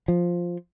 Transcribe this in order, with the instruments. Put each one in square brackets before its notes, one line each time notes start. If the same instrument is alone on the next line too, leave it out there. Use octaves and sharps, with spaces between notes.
[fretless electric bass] F3